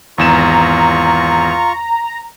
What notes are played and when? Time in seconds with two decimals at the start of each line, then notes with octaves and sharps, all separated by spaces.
0.18 G#1 E2 F4 A#5 C#6 E7